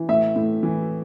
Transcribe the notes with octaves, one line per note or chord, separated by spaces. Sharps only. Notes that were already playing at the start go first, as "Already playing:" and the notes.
Already playing: E3
A2 E5
A2
E3